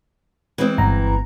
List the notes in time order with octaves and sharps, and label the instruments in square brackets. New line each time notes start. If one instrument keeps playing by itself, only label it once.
[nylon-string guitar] E3 G#3 C4
[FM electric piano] G1 A#5